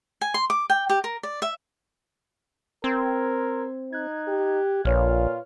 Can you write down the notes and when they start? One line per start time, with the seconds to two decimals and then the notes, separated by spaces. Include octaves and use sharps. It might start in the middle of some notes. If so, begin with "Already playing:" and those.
0.21 G#5
0.34 C6
0.50 D6
0.70 G5
0.90 G4
1.04 A#4
1.23 D5
1.42 E5
2.84 C4 A#4 C6 E6 G#6
3.93 D#4 F#6 G#6
4.28 G4
4.85 A#1 A#2 F4 B4 C#5 F6